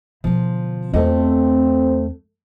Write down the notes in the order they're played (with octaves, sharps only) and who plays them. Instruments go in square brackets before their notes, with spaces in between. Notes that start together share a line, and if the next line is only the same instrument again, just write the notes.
[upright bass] B2 D3 [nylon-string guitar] F3
[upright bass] E2 F4 [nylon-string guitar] A3 A4 D#5 [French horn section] C4